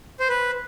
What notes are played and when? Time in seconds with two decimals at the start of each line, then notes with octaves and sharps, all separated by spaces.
0.20 C5
0.29 B4